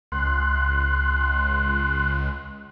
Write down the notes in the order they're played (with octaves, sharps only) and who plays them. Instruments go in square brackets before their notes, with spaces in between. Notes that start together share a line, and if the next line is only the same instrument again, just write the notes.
[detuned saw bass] C#2 [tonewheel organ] C6 F#6